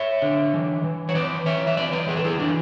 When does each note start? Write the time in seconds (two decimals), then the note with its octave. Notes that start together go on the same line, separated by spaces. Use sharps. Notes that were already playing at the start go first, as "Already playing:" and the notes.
Already playing: C#5 E5
0.22 D3
0.54 E3
0.84 E3
1.09 C#5
1.15 E3 B4 D5
1.46 E3 C#5 E5
1.67 E5
1.77 E3 B4 D5
1.92 B4 D5
2.07 E3 G#4 B4
2.17 A4
2.24 E4 G#4
2.38 E3 D4 F#4